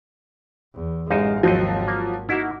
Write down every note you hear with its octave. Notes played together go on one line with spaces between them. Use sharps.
E2
A1 F#2 G#3 D#4 F5
G#1 D#2 F3 F#3 C4 D#5
A#3
A#3 D#4 E4 F#4